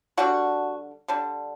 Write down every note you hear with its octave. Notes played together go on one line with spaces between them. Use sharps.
D3 G3 D4 F#4
D3 G3 D4